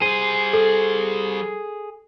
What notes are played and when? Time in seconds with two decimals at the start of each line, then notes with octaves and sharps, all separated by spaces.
0.02 G3 G#4 C5 D#7
0.53 A4